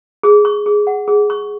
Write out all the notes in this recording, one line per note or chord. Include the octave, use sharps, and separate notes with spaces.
G#4
C#6
G#4
F#5
G#4
C#6